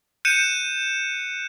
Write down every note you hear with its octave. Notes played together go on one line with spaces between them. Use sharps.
F#6 G6 C#7 D#7 E7